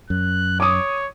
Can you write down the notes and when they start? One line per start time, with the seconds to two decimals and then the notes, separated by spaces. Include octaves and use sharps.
0.10 F#2 F#6
0.60 C#5 D6 D#6